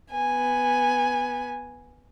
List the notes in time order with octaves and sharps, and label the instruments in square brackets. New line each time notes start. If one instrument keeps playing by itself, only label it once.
[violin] B3 G#5